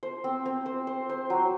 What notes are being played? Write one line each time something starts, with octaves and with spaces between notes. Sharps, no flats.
C5
C4
C4
C5
C5
C5
F#3